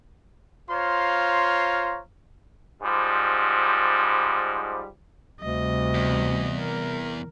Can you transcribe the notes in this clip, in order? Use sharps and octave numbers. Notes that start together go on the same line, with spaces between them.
F4 C5 C#5 F5 A#5 C6
G#2 F3 G3
D2 C3 G3 D#5
E2
A#4